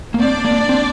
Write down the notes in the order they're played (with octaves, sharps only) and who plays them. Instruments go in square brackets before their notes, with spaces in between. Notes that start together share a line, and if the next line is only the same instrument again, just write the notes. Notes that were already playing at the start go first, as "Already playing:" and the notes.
[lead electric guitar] A#3
[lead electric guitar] C4 [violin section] D4 D5
[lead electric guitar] A#3
C4